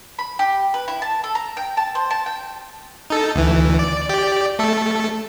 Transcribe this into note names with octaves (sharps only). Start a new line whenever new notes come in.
B5
G4
B4
E4
A5
A4
A#5
G5
A5
C5
A5
G5
D#4 A4
D2 E3
D5
G4 D5
A3 A4